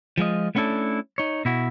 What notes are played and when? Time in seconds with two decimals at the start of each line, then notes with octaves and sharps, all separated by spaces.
0.18 F3 G#3 F4 D#5
0.55 A3 B3 C#4 D4 E4 A4
1.18 D#4 C#5
1.45 B2 E4 F#4